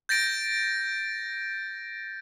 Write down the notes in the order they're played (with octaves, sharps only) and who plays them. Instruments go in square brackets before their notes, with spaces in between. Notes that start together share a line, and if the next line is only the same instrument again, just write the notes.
[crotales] G6 A6 A#6 D7